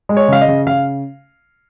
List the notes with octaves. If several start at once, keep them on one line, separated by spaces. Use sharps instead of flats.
G#3
C#5
C#3 F5
D#5
C#3
C#3 F5